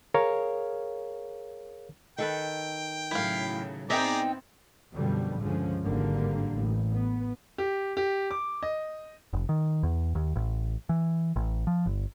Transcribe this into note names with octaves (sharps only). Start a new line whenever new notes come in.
G#4 A#4 C#5 F5
D#3 A4 B4 G5
A2 C#3 F#3 E4 F5
B3 C4 D#4 G#4 D5 E5 G5 A#5
F#2 B2 D3 F3 G3
C#2 G2 D3 F3 G#3 C#4
G#1 G2 D3 G3 A#3
A1
B3
G4
G4
D6
D#5
F1
D#3
E2
D#2
A1
E3
A1
F3
G1